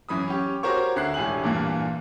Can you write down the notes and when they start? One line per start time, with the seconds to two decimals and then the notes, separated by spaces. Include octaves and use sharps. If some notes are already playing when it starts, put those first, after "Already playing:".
0.09 F#2 E3 B5 D#6
0.28 C#4 G4
0.63 F#4 G4 A#4 C5 C#5 C#6
0.96 D2 F#6 C7
1.14 E1 A2 G4 G#5 F#7
1.43 E2 G2 A#2 E3 A#3